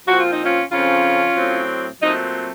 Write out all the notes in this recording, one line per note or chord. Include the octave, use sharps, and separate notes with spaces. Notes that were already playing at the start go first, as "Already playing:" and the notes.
A#2 F3 C4 F#4
F4
D#4
C#4 F4
F2 C#3 F3 C4 C#4 F4
A2 F#3 C4
A#2 F#3 A3 C4 D#4